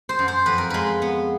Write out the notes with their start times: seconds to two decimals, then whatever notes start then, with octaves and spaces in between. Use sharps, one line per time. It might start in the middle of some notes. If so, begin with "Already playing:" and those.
0.09 C5
0.19 F#2
0.28 C5
0.46 F2 B4
0.58 A#4
0.70 G#3 B4
1.02 B3